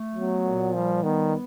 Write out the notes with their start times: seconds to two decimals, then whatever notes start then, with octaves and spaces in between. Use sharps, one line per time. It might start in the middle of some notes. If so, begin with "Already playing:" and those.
Already playing: A3
0.14 F#3 B3
0.44 A#2
0.74 F3 G3
1.03 D#3 B3